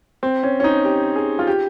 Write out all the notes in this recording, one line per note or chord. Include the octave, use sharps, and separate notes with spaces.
C4
C#4
C#4
D#4
G4
G#4
F4
G4